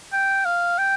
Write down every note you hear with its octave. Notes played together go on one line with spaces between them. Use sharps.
G5
F5
G5